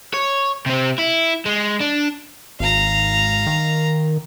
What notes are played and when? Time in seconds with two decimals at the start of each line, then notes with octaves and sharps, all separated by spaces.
0.14 C#5
0.66 C3 C4
0.99 E4
1.46 G#3
1.80 D4
2.60 G#1 F5 A#5
3.47 D#3